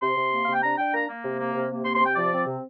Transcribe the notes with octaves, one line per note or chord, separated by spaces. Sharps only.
C3 C6
C3
A#3
C3 F5
G5
D4 A#5
D4 G5
A#3 A#5
A#3
C3
A#3
C3
A#3
C3 C6
C6
C3
G5
F3 D5
C4
C3